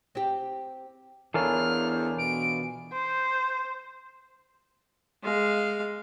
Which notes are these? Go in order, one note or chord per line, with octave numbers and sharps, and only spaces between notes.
C4 G4
E2 E3 D4 F4 A4 A#4 C#5 F6
B2 D7
C5
G#3 F5